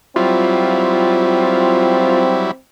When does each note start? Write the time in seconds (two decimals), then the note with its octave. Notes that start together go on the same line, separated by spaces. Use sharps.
0.16 F#3 G3 C4 E4 F4